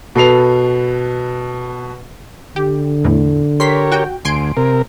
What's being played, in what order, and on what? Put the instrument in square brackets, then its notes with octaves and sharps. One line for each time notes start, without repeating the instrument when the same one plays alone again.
[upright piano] B2 A4 B4 C7 F7
[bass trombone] D3 [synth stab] G4
[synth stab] E2 A2
[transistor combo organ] G4 A#4 C#5 [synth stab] C6 B6
[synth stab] F#4 G5
[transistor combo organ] D2 [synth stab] G#5 C6 D7
[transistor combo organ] C3 A#4